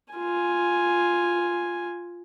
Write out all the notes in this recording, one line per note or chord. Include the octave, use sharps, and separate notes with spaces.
F4 G#5